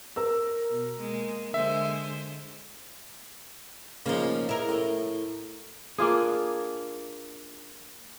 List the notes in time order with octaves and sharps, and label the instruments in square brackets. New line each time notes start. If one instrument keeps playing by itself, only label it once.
[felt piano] A#4 E6
[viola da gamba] B2
G#3 A#3
[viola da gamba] D3 G#3 C5 [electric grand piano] E5
[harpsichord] C#3 D#4 [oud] F3 A#3
[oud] E4 A#4
[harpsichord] A2
[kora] A#3 D4 F4 G#4